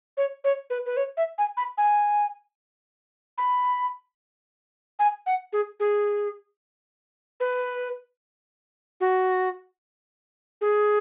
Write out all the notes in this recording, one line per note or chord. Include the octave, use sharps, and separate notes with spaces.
C#5
C#5
B4
B4
C#5
E5
G#5
B5
G#5
B5
G#5
F#5
G#4
G#4
B4
F#4
G#4